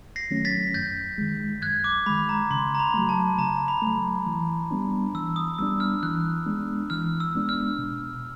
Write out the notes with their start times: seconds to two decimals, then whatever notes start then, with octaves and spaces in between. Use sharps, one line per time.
0.16 A#6 C7
0.31 D#3 F#3 A3 C#4
0.45 A6 B6
0.74 F#2 G6 A6
1.18 D#3 G#3
1.62 F#2 F#6 G#6
1.84 D6
2.06 D#3 G#3 B5
2.29 A#5
2.50 C#3 C6
2.75 A#5
2.79 B5
2.94 F#3 A3
3.09 A5
3.38 C#3 A#5
3.68 B5
3.82 A3
3.87 F#3
4.27 E3
4.71 G3 B3 D4
5.14 E3 E6
5.36 D#6
5.59 G3 B3 D4 E6
5.80 F6
6.03 E3 F#6
6.46 G#3 B3 D4
6.90 E3 F6
7.20 E6
7.35 G#3 B3 D4
7.49 F6
7.78 B2